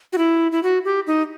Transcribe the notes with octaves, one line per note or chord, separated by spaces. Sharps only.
F#4
E4
E4
F#4
G4
D#4